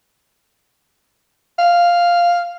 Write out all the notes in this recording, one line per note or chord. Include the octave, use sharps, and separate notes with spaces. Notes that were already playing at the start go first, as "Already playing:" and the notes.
F5